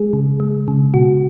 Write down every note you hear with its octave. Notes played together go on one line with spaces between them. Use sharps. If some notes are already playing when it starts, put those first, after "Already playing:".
Already playing: G#3 G#4
C#3
G#3
C#3
B2 F#4